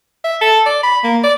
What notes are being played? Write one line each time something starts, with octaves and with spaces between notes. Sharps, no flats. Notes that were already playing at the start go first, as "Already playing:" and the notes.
E5
A4
D5
B5
A#3
D5